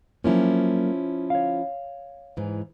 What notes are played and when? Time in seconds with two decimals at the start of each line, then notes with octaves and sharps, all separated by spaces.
0.24 F3 F#3 A#3 C#4 E4
1.30 C#5 F5
2.37 G#2 E3